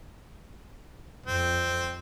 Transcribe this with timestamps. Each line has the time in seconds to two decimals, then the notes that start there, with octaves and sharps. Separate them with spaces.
1.26 F2 C4